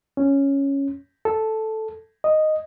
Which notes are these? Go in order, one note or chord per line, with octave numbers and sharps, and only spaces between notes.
C#4
A4
D#5